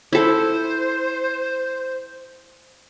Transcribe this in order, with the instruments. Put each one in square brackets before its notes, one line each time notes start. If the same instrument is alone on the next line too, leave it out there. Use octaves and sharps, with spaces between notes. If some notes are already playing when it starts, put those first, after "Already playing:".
[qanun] E4 A4 [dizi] C5